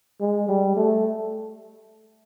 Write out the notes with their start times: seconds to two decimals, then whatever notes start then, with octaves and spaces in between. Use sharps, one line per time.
0.21 G#3
0.49 G3
0.77 A3